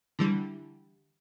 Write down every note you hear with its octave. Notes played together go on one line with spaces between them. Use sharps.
D3 E3 G3